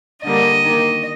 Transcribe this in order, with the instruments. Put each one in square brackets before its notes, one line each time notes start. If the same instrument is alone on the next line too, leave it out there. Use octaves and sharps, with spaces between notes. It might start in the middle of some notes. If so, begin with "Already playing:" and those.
[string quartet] D3 G3 A#3 D#5
D#3 A#3